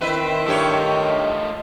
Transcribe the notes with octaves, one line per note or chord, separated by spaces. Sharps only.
D#3 C4 E4 B4 D#5 E5
G2 A3 F4 G4 C#5